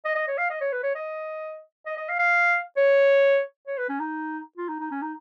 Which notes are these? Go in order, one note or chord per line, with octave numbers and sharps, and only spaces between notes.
D#5
D#5
C#5
F5
D#5
C#5
B4
C#5
D#5
D#5
D#5
F5
F5
C#5
C#5
B4
C#4
D#4
F4
D#4
D#4
C#4
D#4